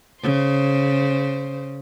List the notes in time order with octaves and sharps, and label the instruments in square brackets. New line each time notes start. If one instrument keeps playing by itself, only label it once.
[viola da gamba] C#3 C5